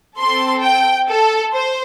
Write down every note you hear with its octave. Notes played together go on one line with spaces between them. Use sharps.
C4 A4 C6
G5
A4
C5